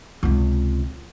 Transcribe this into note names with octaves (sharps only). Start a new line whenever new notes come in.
C#2 C3